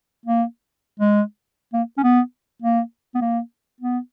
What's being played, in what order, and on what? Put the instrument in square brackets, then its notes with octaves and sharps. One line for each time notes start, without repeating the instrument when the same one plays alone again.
[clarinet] A#3
G#3
A#3
C#4
B3
A#3
B3
A#3
B3